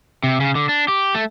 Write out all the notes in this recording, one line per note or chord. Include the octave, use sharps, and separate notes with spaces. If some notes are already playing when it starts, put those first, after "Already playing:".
C3
C#3
D3
D4
G4
A3